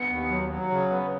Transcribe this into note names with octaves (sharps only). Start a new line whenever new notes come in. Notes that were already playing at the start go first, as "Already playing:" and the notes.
Already playing: B3 C#7
D#2
F#3
F#3
C#3
B3